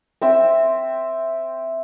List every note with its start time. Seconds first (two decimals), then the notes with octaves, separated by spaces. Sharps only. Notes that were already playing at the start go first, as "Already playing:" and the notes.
0.22 C4 E5